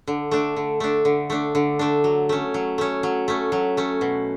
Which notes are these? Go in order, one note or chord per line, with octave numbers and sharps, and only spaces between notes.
D3
A3 D4
D3
A3 D4
D3
A3 D4
D3
A3 D4
F#3
A3 C#4
F#3
A3 C#4
F#3
A3 C#4
F#3
A3 C#4
B2